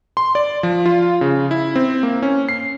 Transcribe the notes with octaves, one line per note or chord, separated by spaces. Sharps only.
C6
D5
F3
F4
C#3
E4
C4
A#3
C#4
C7